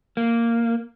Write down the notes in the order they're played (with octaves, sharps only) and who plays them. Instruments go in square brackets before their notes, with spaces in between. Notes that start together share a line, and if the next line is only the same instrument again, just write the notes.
[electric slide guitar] A#3